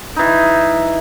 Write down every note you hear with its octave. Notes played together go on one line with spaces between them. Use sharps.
E3 D#4